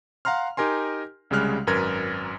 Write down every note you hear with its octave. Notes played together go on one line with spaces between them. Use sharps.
F5 F#5 A#5 C6 F6
D#4 G4 A#4 G#5 C6
C2 C#3 G3 G#3 F6 F#6
G#1 F#2 A#4 B4 G#6